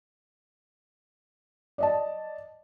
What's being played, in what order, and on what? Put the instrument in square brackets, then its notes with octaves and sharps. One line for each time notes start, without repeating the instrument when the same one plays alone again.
[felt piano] D5 D#5 A5